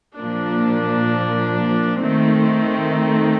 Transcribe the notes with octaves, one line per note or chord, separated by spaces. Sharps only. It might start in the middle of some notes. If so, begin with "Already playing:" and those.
A#2 F3 A#3 D4
D#3 A3 C4